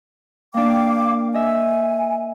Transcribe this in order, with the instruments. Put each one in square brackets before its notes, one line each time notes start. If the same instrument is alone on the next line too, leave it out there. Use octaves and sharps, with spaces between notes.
[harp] A#3 D4 [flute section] F5 G5 D6
[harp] D#5 E5 [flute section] G#5